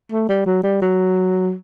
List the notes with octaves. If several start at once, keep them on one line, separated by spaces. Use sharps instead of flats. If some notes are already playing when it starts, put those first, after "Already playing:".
A3
G3
F#3
G3
F#3